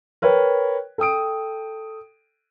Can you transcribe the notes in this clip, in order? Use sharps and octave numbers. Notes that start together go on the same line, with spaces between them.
A#4 B4 C#5 G5
A4 G5 D#6 D7